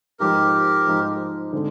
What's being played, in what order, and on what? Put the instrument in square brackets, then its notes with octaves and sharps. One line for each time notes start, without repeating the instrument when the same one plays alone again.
[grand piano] G#2 F3 G#3 D#4 [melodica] G4 A#4
[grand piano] G#2 F3 G#3 D#4
D3 G#3 C4 D#4